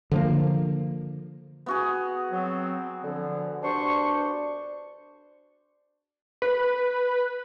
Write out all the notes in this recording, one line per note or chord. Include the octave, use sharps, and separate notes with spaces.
D3 F3 A#3
B3 F#4 G#4
F#3 C4
D3 F3
C2 D4 C5 C#6
B4